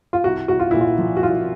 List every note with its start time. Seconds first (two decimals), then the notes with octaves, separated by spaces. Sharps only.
0.13 F4
0.24 C2 F#4
0.48 C2 F#4
0.60 F4
0.71 A#2 E4
0.81 F4
0.98 F3
1.17 F#4
1.23 C2 F4